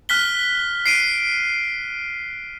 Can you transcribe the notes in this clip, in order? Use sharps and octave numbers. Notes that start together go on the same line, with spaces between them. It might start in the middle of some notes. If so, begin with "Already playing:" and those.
F6 F#6 B6 G7
C7 D7 D#7